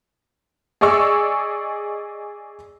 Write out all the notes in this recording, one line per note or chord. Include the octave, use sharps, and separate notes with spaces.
G#4 D5 D#5 C#6 E6